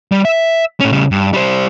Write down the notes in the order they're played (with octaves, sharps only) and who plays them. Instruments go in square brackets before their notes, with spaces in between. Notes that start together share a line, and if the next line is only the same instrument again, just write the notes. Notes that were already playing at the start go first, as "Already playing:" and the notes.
[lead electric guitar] G3
E5
A2 C#4
C#3 G3
G2
G3 C5